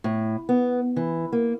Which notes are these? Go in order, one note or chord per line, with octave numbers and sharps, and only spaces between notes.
A2
B3
E3
A#3